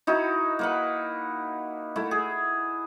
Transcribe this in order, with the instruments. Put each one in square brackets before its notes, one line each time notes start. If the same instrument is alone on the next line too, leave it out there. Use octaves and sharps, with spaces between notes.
[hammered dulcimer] D#4 E4 F#4 A#4
A#3 B4 F#5
A3 E4
G#4